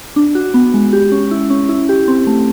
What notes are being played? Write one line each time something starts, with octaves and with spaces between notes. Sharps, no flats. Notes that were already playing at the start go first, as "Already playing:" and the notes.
D4
F#4
B3
G#3
G4
C#4
E4
C#4
E4
G4
C4
A3